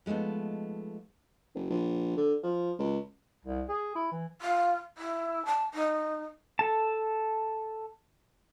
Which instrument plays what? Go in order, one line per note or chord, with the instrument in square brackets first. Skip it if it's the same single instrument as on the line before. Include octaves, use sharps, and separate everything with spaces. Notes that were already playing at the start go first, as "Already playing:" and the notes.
[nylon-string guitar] F3 G#3 A3 B3 D#4
[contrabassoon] F#1
A#1
D3
F3
C#2
[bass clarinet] C2
G#4
E4
E3
[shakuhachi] F4
E4
A5
D#4
[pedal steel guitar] A4 A5